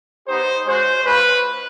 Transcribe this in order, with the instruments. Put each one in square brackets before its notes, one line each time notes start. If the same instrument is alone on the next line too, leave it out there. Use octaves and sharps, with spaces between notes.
[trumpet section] B3 D#4 G4 C5
G#3 C#4 F#4 C5
G#3 C#4 F4 B4